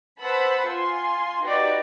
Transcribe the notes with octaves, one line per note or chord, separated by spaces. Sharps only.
B4 C5 F#5 A5 B5 E6
F4 G#5 C6
D#4 F#4 G4 B4 D5